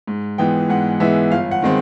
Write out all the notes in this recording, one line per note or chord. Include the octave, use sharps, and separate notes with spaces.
G#2
E3 G#3 B3 G5
G#2 F#5
E3 G#3 B3 E5
G1 F5
F#5
D#3 G#3 C4